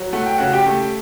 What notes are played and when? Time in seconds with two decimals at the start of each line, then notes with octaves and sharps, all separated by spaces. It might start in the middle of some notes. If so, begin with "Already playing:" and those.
Already playing: F#3
0.13 A3 F#5
0.26 G5
0.38 C#3 F#4 F#5
0.53 G4 G5
0.66 A3